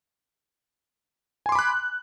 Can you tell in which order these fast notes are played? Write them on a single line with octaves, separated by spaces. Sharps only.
G#5 C6 D6 B5 F#6